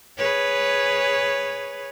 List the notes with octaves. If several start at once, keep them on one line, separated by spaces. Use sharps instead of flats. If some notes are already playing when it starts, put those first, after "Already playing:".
G#4 B4 C#5